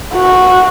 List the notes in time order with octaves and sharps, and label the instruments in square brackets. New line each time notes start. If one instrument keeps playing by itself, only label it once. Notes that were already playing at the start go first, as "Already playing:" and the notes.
[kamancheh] F#4